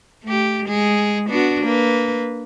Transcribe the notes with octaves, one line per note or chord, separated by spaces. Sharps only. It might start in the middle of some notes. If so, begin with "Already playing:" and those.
A3 G4
G#3 G#4
B3 D4 F#4
A#3 B4